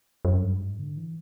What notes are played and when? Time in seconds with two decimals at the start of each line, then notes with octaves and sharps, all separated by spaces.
0.25 F#2
0.43 G2
0.61 G#2
0.79 D3
0.97 E3